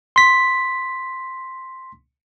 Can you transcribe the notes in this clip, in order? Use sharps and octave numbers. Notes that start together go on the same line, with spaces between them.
C6 B6